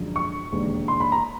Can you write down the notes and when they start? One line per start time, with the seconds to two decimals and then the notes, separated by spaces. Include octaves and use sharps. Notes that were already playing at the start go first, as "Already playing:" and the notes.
Already playing: F#2 D3 F3 G#3
0.16 C#6
0.52 E1 D#2 D3
0.88 C6
1.00 B5
1.12 A#5